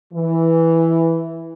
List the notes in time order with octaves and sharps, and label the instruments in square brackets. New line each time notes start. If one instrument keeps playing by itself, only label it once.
[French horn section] E3